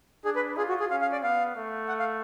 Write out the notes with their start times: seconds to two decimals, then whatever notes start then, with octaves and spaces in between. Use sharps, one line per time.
0.25 D4 G#4
0.36 B4
0.57 F4 G#4
0.69 F#4
0.80 G#4
0.90 C#4 F5
1.01 F5
1.12 D5
1.23 B3 F5
1.56 A3
1.88 F#5
2.00 F5